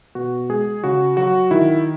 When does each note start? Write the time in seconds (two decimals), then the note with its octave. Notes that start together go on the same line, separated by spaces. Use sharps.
0.15 B2 F#4
0.49 G#3 G#4
0.84 C#3 F#4
1.17 F#3 F#4
1.51 D#3 E4